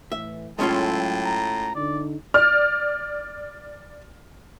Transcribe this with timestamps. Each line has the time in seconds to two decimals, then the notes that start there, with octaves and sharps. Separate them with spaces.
0.12 A2 E3 E5
0.59 A2 F#3 G#3 C#4 F4 A4 G5
1.25 A#5
1.75 D3 D#4 D5
2.34 D5 F6